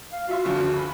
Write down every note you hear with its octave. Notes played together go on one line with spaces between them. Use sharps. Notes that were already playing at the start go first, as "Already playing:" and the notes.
F5
F4 F#4 E5 C6
F#1 D2 F3
B5